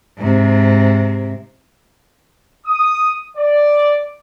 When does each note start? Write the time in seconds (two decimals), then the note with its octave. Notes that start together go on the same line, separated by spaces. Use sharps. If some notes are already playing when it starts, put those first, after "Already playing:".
0.18 G#2 C3
2.65 D#6
3.36 D5